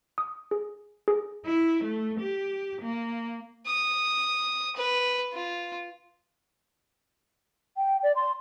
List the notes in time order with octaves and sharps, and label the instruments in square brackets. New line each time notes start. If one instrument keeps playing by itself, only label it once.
[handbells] D#6
G#4
G#4
[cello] E4
A3
G4
A#3
[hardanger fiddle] D#6
B4
F4
[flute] G5
D5
C6